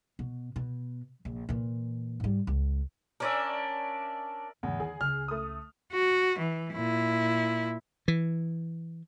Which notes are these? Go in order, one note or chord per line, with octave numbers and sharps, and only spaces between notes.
B2
B2
A#1
A#2 E3
G#2 G3
C#2
C#4 D4 A#4 D5 E5
E2 G#2 C#3
D#3 G#4
C#2 C#3 F6
A3 D#6
F#4
E3
A#2 E4
E3